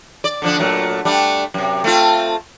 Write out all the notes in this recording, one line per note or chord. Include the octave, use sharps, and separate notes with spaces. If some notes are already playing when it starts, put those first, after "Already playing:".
D5
D3 F3 D4
A#2 F#3 A3
G3 A3 D4
F#2 C3
A3 C4 F4